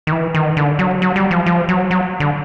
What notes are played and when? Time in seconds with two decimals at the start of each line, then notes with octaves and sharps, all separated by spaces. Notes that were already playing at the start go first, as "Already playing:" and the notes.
0.07 D#3
0.12 E3
0.35 D#3
0.57 D3
0.79 F#3
1.02 F#3
1.16 G3
1.31 F3
1.46 F3
1.69 F#3
1.91 F#3
2.20 D3